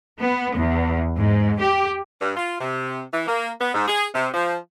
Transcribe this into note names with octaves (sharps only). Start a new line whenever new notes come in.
B3
E2
G#2
G4
G2
F4
C3
E3
A#3
B3
G#2
G#4
C3
F3